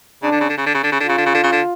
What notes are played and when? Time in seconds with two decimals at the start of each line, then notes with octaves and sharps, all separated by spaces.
0.23 C#3 D4
0.32 D3
0.40 C#3
0.49 D3
0.57 C#3
0.66 D3
0.74 C#3
0.84 D3
0.92 C#3
1.00 D3
1.05 C#3 F4
1.18 D3
1.26 C#3
1.35 D3
1.44 C#3
1.52 D3